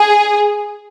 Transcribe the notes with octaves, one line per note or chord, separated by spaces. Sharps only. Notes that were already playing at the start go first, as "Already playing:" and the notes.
Already playing: G#4